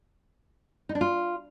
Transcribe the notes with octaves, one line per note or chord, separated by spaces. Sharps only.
D#4
D4
F4